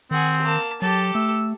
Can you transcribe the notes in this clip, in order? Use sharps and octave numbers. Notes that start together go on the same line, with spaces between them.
D#3 C4 G#4 F#5
A#3 A5
F#3 G4 A4 A5
A3 E6